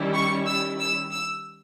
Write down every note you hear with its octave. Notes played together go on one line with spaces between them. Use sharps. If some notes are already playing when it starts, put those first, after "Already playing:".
Already playing: D#3 G3 C#4 E4
C#6
E6
E6
E6